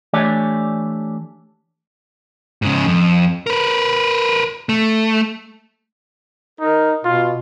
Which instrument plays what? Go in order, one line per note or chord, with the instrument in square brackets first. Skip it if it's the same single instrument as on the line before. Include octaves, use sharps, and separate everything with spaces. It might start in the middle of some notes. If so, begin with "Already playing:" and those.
[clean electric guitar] E3 A3 D4 G4 C#5 D5
[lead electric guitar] G#2 C#3
F2
A#4 B4
A3
[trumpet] D#4 [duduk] A#4
[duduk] B2 [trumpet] F4